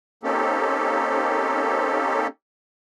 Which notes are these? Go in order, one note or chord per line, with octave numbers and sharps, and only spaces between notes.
A#3 C4 C#4 D#4 G4 A4